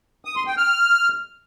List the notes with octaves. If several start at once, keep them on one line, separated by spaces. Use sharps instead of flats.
D#6
C6
G5
F6